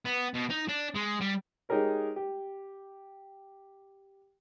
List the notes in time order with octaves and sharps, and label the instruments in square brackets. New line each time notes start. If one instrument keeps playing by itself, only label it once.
[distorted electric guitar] B3
B2
D#4
D4
G#3
G3
[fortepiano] G#3 D#4 G4 G#4 A#4 C#5
G4